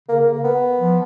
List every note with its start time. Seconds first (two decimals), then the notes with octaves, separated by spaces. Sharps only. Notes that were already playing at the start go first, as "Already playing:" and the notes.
0.08 C#3 A#3
0.20 A#3
0.32 A#3
0.44 B3
0.79 F3